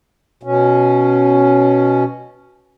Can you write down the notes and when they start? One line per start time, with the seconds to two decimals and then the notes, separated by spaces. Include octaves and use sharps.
0.43 B2 C#4